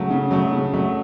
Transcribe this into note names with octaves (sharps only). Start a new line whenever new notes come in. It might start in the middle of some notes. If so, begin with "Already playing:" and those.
Already playing: C#3 F#3 A3
C#3
F#3 A3
C#3
F#3 A3